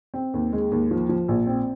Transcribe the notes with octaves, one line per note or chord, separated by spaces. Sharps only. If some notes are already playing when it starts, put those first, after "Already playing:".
C4
D#2
G#3
D#2
F3
F3
A#1
C4